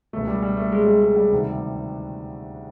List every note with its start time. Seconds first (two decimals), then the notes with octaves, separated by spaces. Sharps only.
0.13 C#2 B2 A3
0.28 G3
0.42 G3
0.57 A3
0.72 G#3
0.82 G#3
0.87 G3
1.02 G#3
1.16 G3
1.31 D2 C3 D#3